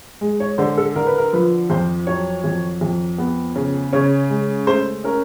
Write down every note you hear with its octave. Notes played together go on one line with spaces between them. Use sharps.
G#3
C#5
D3 C5
A4
D3 A#4
B4
A#4
F3 B4
F2 C5
F#3 C#5
F2
F2
B3
C#3
C#3 C#5
G#3
A3 C5
C#4 A#4